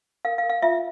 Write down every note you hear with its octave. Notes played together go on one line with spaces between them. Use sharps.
A#4 F5
F5
A#4
F5
F4 E5